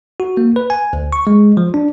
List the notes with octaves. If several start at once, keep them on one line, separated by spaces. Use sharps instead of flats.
F#4
A#3
B4
G#5
D2
C#6
G#3
F3
D4